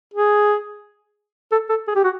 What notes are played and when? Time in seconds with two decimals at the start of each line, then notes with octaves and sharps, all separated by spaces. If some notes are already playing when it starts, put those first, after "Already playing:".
0.14 G#4
1.52 A4
1.69 A4
1.87 G#4
1.95 G4
2.04 F#4